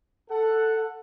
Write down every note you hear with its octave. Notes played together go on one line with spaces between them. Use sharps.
A4 F#5